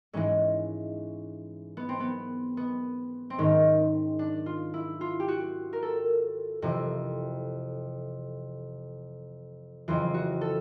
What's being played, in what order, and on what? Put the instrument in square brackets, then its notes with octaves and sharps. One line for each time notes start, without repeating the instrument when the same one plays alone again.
[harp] G#2 E3 G#3 C#4
B3
C4
B3
B3
C4
G#2 D#3 G#3 C#4
D4
F4
E4
F4
G4
F#4
A#4
A4
F2 C3 E3
F2 C#3 E3 F4
F#4
A4